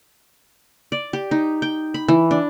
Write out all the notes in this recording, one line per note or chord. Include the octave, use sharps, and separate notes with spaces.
D5
G4
D#4
G5
B5
E3
D4